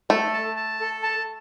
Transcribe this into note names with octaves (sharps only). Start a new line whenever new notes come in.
A3 A4
A5
A5
A4
A5